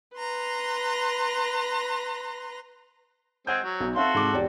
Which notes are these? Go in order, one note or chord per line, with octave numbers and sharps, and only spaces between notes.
B4 A#5 C6
G#3 C4 G#4 F#5 G6
F#3
B1 D#4
C4 F#4 A4 E5 F5 C6
G#2 C3 D6
E1 G4 D5